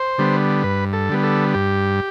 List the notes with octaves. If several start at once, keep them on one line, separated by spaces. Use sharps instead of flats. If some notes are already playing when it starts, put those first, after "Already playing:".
Already playing: C5
D3 G3 B3
G2 B4
A4
D3 G3 B3
A4
G2 G4